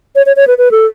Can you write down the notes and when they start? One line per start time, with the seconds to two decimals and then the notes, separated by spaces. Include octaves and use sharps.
0.16 C#5
0.26 C#5
0.36 C#5
0.47 B4
0.58 B4
0.71 A4